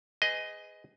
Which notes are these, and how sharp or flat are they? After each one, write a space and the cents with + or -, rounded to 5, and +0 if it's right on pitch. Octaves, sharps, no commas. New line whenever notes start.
G#4 +0 B4 +40 D#5 +5